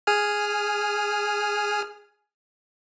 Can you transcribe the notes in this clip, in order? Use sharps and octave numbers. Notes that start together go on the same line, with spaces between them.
G#4 G#5 F6